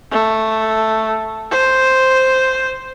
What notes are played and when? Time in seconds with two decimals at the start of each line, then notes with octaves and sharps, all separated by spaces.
0.11 A3
1.51 C5